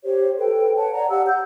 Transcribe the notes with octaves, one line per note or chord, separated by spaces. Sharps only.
G4 C5 C#5
A4 B4 G5
C#5 F#5 A5
C#5 D5 F#5 A#5
G4 F5 F#5 E6
G6